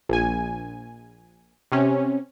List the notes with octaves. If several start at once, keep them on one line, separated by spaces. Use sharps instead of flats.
A#1 G#5
C3 C#4